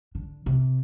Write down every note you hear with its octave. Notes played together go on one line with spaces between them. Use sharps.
D3
C3